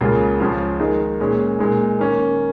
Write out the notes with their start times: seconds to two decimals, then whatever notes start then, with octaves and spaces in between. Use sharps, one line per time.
0.01 C#2 C#3 A#3 F4 G#4
0.39 C#2 C#3 F3 C#4 F4
0.79 D#3 G#3 D#4 G#4
1.20 A#2 G#3 C#4 G#4
1.59 A#2 G#3 D#4
1.99 D#3 A#3 C#4